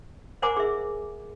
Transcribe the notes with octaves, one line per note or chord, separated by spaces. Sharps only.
A#4 C5 F#5 G#5 A#5 D6
G#4 E5